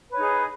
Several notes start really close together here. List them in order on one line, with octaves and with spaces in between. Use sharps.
B4 C#5 D#4 G#4